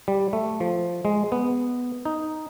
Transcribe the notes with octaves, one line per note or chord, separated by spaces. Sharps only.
G3
A3
F3
G#3
B3
D#4